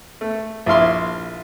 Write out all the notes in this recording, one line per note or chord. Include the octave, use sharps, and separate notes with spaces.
A3
A#1 E4 F5 C6